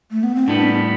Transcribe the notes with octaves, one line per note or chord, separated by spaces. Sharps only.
A3
B3
C4
A2 G3 B3 D4